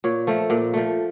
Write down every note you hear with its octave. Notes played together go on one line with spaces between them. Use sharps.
A#2 C#5
F3 A3
A#2
F3 A3